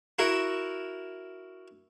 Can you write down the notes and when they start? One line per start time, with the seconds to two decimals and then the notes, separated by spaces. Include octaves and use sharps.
0.19 E4 F#4 A#4 E5